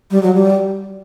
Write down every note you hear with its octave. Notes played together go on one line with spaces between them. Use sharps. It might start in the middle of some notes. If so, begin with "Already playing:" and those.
G3
F#3
G3